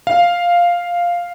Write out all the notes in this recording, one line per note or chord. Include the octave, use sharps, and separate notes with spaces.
F5